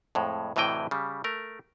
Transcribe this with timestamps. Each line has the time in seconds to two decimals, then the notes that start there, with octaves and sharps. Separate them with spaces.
0.15 F2 A2 G#3
0.56 D2 A2 C3 E3 D#5 G5
0.91 C#3 G3
1.24 A3 A#4